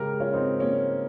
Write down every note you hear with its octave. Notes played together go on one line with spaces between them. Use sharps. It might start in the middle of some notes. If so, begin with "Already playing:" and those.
Already playing: C#3 G#3 G4 A#4
C#4 F4
C4 D#4
A#3 C#4